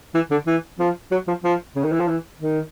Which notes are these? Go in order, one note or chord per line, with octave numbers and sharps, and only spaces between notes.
E3
D3
E3
F3
F#3
F3
F3
C#3
D#3
E3
F3
E3
D#3